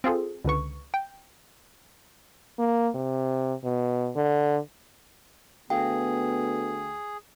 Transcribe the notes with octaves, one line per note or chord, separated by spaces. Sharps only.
C4 F4 G#4 A4
C#2 D3 B4 C#6
G5
A#3
C3
B2
D3
D2 B3 G#4 F5 G5